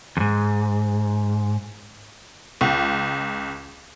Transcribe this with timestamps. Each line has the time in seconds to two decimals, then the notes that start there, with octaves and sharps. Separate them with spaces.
0.17 E2 G#2
2.61 C#2